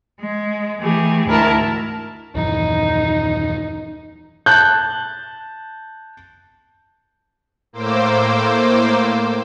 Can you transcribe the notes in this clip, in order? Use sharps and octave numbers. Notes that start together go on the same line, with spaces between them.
G#3
E3 A3 G4 G#4
D2 G#2 E4 A#4 E5 A5
D#1 F#2 E3 D#4
A5 F#6 G6
A2 A#3 C5 D6 E6